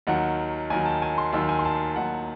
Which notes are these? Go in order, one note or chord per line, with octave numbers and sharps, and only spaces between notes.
D#2 D#3 F#3 F#5
D#2 D#3 F#3 G#5
A5
G#5
C6
D#2 D#3 F#3 E6
G#5
C6
A5
D#2 D#3 F#3 F#5